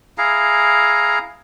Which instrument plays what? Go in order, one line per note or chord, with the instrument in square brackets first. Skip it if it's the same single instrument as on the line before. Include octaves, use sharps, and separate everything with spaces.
[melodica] E4 G#4 F5 A#5